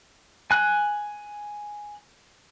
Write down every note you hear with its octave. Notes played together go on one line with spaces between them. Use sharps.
G#5 F#6